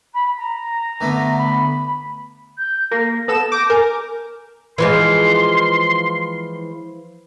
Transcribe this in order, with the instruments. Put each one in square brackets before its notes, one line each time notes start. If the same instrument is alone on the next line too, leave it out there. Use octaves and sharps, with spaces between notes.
[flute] B5
A#5
[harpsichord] D3 A3 B3
[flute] B5
[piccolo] G6
[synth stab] A#3 [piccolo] A#6
[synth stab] B3 A4 E7
[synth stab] D6 A#6 [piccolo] G6
[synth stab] A#4 [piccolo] G#5
[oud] E3 F3 G#3 [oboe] C6